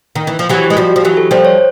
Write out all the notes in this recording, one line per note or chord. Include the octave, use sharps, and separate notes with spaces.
D#3
E3
F3
E3 F#3 G4
G4
G#3
F3 G3 F#4
F#4
F3
E3 F#3 G4
A4
F3 G3 C5
C#5